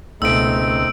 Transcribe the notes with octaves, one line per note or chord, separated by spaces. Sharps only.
C#2 B2 A3 C4 D#4 E6 D7